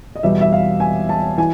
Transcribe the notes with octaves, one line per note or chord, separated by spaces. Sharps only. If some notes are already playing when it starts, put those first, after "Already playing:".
D#5
E2 B2 G3 E5
E5
F5
G#5
A5
E3 G#5